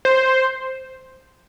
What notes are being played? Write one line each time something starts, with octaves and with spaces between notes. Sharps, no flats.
C5